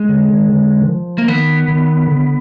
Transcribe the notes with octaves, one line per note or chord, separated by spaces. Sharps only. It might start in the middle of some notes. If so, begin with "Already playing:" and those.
Already playing: G#3
D3
D#3
D3
D#3
F3
A#3
D#3 B3
D#3
D3